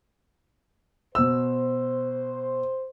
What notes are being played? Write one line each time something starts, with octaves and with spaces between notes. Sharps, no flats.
B2 C5 E6